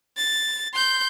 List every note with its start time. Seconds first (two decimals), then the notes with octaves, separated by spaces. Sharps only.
0.17 A6
0.73 C6 G6